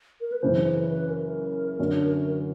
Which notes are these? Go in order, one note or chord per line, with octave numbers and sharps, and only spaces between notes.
A#4
B4
F#2 C#3 E3 C5
B4
B4
A#4
F#2 D3 F#3